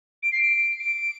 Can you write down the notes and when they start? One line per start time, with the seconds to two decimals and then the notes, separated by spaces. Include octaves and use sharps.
0.23 D7
0.32 C7
0.41 D7
0.80 D7